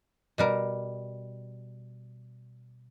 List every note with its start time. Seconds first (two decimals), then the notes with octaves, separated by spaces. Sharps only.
0.38 B2 G3 A#4